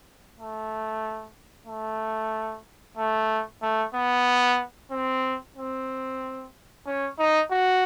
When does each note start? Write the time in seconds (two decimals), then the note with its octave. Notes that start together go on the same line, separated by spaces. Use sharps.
0.37 A3
1.67 A3
2.98 A3
3.62 A3
3.94 B3
4.91 C4
5.56 C4
6.87 C#4
7.19 D#4
7.51 F#4